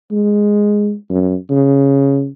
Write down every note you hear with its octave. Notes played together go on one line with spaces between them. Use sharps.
G#3
F#2
C#3